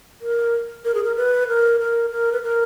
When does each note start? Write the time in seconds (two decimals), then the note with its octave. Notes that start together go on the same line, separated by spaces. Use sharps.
0.21 A#4
0.85 A#4
0.95 G#4
1.04 A#4
1.16 B4
1.48 A#4
1.80 A#4
2.10 A#4
2.32 B4
2.42 A#4